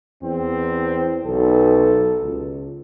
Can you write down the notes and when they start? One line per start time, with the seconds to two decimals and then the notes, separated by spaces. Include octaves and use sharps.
0.23 E2 C4
1.26 B1 A4
2.24 C#2